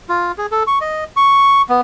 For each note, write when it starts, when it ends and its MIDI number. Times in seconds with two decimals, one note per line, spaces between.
0.09 0.32 65
0.38 0.46 68
0.52 0.63 69
0.67 0.79 85
0.81 1.04 75
1.17 1.62 85
1.69 1.81 59